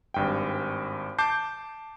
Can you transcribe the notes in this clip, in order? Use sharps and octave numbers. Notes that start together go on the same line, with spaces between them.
G#1 G2 G5
A5 D6 G6 C7